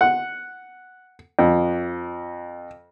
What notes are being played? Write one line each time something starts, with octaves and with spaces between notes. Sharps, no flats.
F#5
F2